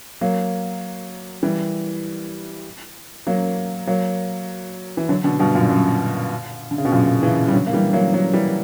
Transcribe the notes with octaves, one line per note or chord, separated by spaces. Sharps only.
F#3 A#3
E3 G3
F#3 A#3
F#3 A#3
E3
D3 F#3
B2 D3
G2 B2
F#2 A#2
F#2
D3
C#3
B2
F#2 A#2
C#3 E3
G3
D3 F#3
A#3
E3 G3
F#3 A#3
F#3 A#3
E3 G3